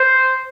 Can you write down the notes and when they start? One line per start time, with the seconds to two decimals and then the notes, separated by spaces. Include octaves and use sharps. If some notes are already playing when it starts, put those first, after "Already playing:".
Already playing: C5